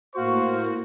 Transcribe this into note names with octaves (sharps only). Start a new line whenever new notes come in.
A2 A#3 F#4 C5 F5 C#6